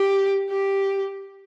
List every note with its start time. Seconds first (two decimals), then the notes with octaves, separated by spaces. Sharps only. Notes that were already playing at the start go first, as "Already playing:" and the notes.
Already playing: G4
0.50 G4